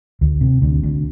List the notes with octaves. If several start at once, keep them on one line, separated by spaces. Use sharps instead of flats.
D2
C3
D2
D2